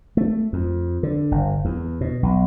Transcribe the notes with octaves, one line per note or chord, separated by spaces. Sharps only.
A3
F2
D3
G1
E2
B2
B1